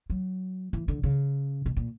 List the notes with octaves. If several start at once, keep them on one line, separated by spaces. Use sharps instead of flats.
F#3
E3
D3
C#3
B2
A#2